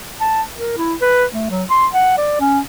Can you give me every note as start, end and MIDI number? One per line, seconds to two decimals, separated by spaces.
0.20 0.42 81
0.57 0.77 70
0.77 0.95 64
1.01 1.24 71
1.32 1.50 57
1.50 1.64 54
1.70 1.86 84
1.93 2.17 78
2.17 2.39 74
2.40 2.59 61